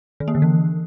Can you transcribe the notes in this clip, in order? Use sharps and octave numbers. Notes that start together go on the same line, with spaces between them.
D#3
A#3
D3
E3